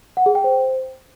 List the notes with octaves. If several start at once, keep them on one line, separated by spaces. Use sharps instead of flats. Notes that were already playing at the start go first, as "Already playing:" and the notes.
F#5
G#4
G5
C5